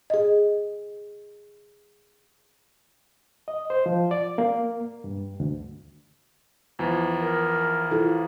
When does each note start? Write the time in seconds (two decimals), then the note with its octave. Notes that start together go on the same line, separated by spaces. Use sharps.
0.10 G#4 D#5
3.48 D#5
3.70 C5
3.86 F3
4.11 D5
4.38 A#3
5.04 G2
5.40 D2
6.79 E2 E3 F3
7.22 A#4
7.91 E4 F4 A4